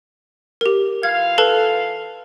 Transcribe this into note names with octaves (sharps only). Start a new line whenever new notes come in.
G4 A#4
E3 F4 F5 G#6
A4 B4 A5